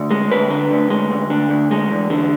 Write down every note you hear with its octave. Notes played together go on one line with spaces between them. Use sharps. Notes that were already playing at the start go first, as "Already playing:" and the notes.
Already playing: D2
G#3
D2 B4
D3
D2
G#3
D2
D3
D2
G#3
E2
D3